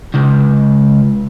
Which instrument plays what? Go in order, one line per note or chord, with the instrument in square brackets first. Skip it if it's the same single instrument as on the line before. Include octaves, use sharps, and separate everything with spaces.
[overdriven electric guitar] C#2